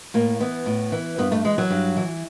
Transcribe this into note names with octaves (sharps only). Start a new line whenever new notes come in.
A2 A#3
E3 B3
A2
E3
G2 B3
A3
E3 G#3
F#3
G2
E3